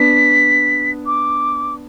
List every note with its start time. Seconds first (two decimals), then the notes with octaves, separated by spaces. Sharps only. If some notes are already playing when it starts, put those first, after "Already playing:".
Already playing: B3 D4 B6
1.06 D6